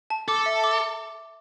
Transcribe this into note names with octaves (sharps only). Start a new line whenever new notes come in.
A5
A4 D6
E5
D6